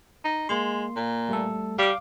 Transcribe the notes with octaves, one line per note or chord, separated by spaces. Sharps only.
D#4
G#3 A#3 C6
A#2
G3 A3 A4
G3 F5 D6